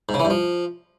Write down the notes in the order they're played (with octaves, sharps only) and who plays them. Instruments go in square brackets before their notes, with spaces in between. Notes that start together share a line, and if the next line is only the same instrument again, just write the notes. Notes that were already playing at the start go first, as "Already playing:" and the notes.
[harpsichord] G#2
C#3
E3
G2
F3